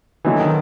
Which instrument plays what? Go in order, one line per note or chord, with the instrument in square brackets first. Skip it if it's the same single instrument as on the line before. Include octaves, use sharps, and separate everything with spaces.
[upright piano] D3 F#3 B3 D#4 [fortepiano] E3
[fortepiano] D#3